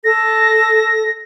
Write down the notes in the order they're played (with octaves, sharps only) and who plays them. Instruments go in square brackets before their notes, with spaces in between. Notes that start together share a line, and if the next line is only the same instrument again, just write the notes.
[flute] A4 [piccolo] A#6